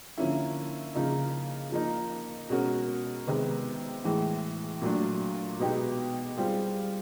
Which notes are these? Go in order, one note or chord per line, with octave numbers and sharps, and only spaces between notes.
D3 F3 A#3 C#4 E4
C#3 F3 A#3 D#4
F3 A#3 D#4
B2 G#3 C#4 F#4 A#4
C3 D#3 G#3 B3
A2 E3 G#3
A#2 F#3 A3 D4
B2 G#3 B3 D#4 G4
G3 C4 F4 G#4